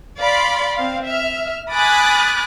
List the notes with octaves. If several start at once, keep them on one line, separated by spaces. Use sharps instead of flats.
D5 F5 B5 C6
C4 F5
E5 F6
G#5 B5 D6 D#6 F#6 A6